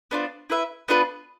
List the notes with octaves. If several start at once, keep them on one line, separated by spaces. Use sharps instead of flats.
B3 D4 F4 C5
E4 B4 E5
B3 D4 F4 B4